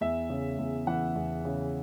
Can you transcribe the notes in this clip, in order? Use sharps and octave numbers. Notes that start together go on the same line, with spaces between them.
E2 E5
C#3
E2
E3 F#5
E2
C#3